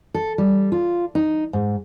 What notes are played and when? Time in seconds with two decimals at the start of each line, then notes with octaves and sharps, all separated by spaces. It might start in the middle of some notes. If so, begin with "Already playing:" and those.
0.14 A4
0.38 G3
0.72 F4
1.15 D#4
1.53 G#2